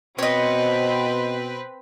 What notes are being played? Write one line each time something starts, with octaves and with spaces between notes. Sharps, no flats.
B2 C4 B4 C#5 D#5